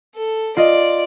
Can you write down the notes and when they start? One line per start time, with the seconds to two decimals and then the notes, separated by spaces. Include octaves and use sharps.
0.15 A4
0.57 F4 D5 D#5